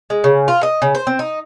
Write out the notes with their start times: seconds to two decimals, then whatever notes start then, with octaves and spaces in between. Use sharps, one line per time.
0.10 G#3
0.24 C#3
0.48 F4
0.63 D#5
0.82 C#3
0.95 C5
1.07 C4
1.19 D#4